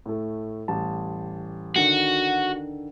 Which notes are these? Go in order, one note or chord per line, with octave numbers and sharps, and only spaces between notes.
A2 A3
A1 G3 A5
D3 D#3 F#4